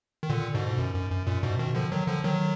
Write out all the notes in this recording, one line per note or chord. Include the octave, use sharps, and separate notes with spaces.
D#3
A#2 D3
G#2 B2
G#2
F#2
F#2
F#2
F#2 A#2
G#2 B2
B2 D#3
D3 F3
D#3 F#3
D3 F3
D#3 F#3